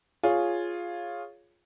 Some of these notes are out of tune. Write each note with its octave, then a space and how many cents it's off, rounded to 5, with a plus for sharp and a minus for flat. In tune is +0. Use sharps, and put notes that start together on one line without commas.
F4 +0 G#4 +0 C#5 +0